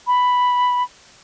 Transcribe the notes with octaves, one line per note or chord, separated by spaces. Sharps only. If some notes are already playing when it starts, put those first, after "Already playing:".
B5